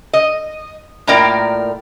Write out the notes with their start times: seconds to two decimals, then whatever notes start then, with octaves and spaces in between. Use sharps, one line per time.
0.13 D#5
1.07 A2 A#3 F4 A#4 D5 G5